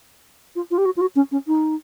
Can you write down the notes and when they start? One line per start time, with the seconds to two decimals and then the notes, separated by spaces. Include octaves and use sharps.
0.56 F4
0.71 F4
0.78 G4
0.85 F#4
0.97 F4
1.01 F#4
1.16 C#4
1.32 C#4
1.47 D#4